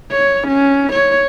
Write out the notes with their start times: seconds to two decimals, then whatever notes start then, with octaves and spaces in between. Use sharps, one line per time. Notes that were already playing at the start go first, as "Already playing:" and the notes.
0.11 C#5
0.48 C#4
0.93 C#5